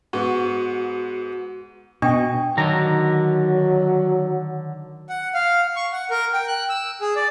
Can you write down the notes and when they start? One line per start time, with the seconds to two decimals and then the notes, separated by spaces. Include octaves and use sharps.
0.13 G#2 B3 F#4
2.02 B2 D4 D#5 G5 C#6
2.57 D3 D#3 F#3 A#5
5.09 F#5
5.34 F5
5.76 C#6
5.92 F#5
6.10 A#4
6.33 G5
6.48 F#6
6.69 E6
7.01 G#4
7.16 D5